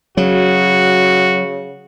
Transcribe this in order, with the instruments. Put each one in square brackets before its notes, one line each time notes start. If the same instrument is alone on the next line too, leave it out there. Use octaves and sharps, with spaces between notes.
[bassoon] C#3 [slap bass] F#3 [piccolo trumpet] F#4